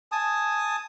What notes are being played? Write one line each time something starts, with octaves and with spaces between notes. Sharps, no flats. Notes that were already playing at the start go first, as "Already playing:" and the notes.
G#5 A5 D#6